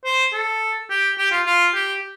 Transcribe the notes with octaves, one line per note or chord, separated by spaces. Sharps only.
C5
A4
G4
G4
F4
F4
G4